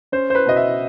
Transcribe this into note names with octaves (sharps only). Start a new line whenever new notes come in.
C#4 C5
C5
B4
B2 D#5
E5